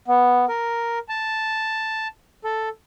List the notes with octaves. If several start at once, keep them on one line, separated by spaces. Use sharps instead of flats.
B3
A#4
A5
A4